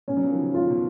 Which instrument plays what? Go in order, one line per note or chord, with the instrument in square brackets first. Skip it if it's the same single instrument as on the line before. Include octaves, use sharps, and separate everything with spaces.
[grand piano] B2 [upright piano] C#4
[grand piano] F#3
F3
D#3
C#3
[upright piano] F4
[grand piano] B2